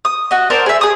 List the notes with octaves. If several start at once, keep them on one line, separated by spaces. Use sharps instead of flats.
D#6
F#4 D#5
C4 D4 A#4 C5
G#4 E5
G#4 D#6